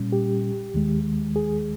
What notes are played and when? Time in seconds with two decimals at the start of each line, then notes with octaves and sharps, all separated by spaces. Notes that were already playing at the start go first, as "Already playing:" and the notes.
Already playing: A#2 G3 C#4
0.12 G4
0.74 D#2 D#3 G#3
1.36 G#4